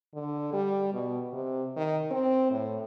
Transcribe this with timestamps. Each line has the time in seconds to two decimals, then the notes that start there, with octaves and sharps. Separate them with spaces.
0.15 D3
0.52 G3
0.93 B2
1.33 C3
1.76 D#3
2.11 C4
2.51 A2